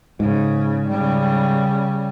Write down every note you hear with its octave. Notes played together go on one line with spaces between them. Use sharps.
G#2 C#3
C#3 G3